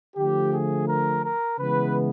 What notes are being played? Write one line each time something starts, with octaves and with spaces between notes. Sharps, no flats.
D3 F3 A3 G4
G#4
A#4
A#4
C#3 E3 G#3 B3 B4